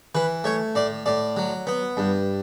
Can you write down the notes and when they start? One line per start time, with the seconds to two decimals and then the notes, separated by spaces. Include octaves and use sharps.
0.15 E3 B4
0.44 A3 C#5
0.75 A2 D5
1.06 A2 D5
1.37 F#3
1.67 B3
1.97 G2